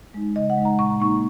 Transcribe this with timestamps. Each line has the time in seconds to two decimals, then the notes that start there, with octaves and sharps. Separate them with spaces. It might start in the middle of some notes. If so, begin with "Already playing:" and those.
0.14 G#3 D#4
0.36 C#3 D#5
0.50 F#5
0.58 G#3 D#4
0.65 A#5
0.79 A#2 C#6
0.90 A#5
1.00 A#3 D#4 C#6